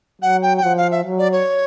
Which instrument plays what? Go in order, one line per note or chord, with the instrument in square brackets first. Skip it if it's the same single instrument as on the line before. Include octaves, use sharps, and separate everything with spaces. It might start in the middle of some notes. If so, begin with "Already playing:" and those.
[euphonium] F#3 [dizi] F#5
[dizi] G5
G5
[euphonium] F3 [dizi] F#5
[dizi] F5
E5
[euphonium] F#3
[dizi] D5
C#5